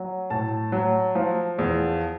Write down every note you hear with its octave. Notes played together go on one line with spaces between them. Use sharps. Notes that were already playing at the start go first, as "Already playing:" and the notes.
Already playing: F#3
A2 A5
F#3
F3
E2